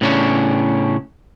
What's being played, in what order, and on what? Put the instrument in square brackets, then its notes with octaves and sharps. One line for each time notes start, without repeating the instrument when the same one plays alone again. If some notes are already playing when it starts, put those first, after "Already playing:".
[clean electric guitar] A2 C#3 C#4 D4